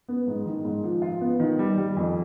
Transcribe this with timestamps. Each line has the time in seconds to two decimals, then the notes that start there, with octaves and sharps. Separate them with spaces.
0.09 B3
0.27 G#2
0.45 D#3
0.65 G#2
0.84 F3
1.02 F4
1.21 B3
1.40 D#3
1.59 G3
1.78 G3
1.97 F2